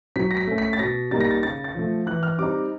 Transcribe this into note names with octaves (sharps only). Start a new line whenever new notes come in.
F#3 B6
A#6
B6
A3 C#4
B6
A6
B2 A#6
G3 A#3 D#4 A6
A#6
A6
C#3 A6
A6
F3 A3
E3 F#6
F6
G3 C4 D#4 D6